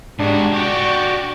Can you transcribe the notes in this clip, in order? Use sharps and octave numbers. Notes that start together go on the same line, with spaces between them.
G#2 G#3 D4 F#4 G4
F#4 G4 D5 C#6